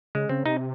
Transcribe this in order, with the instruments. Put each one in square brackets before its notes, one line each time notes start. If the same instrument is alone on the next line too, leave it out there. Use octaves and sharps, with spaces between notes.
[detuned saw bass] C#3 [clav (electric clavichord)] G#3
[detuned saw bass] C#3 [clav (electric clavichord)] C4
[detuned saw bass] C3 [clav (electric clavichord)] D#4